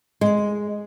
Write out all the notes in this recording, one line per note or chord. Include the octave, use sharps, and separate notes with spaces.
G#3